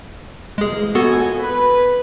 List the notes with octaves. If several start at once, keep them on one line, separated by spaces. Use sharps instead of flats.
C3 E3 G#3 A#3 G#4
A#1 B3 F#4 A4 G#5
B4